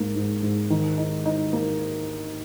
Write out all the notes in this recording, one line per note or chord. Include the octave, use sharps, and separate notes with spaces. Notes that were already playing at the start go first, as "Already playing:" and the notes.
Already playing: G#2 A#3
G#2
G#2
D#3
D#4
D#4
A#3